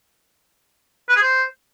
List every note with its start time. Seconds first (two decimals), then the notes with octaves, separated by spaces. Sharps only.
1.09 B4
1.16 G#4
1.22 C5